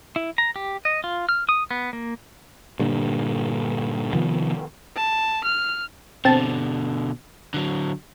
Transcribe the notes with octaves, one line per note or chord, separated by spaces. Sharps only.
E4
A#5
G4
D#5
F4
F6
D#6
B3
A#3
G2 A#2 D3
C3 D#3 F3 B3
A5
F6
B2 D3 C4 A5
D3 F#3